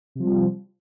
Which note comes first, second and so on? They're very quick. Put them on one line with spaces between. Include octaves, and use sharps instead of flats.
C3 F3 G3